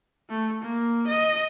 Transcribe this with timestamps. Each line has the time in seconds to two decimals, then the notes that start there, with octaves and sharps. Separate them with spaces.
0.30 A3
0.62 A#3
1.07 D#5